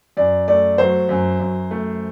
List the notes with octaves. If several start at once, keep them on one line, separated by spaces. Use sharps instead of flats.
F#2 D5
A3 D5
F#3 C5
F#2
F#2
A3